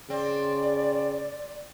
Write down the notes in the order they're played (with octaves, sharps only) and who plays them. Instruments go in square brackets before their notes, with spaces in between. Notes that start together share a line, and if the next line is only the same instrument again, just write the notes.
[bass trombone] C#3 [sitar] C4 [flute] D5